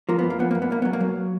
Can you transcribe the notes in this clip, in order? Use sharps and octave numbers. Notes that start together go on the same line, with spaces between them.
F3 A#3
B3
F#2
A#3
F3 B3
F#2 A#3
B3
B1 A#3
F#3 B3
A#3
F#3